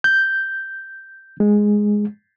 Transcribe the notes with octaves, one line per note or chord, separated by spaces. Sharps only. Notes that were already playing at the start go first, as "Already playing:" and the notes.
G6
G#3